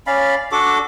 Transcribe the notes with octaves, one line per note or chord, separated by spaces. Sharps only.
C#4 D5 F5 B5
D4 F#4 A4 D6